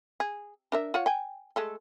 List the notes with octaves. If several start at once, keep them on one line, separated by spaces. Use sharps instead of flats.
G#4
D4 A#4 E5
F4 C#5 F#5
G5 G#5
G#3 A3 A4